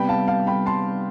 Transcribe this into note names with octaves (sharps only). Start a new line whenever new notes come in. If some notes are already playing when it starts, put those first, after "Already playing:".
Already playing: C3 G3 B3 G5 B5
F5 A5
F5 A5
G5 B5
A5 C6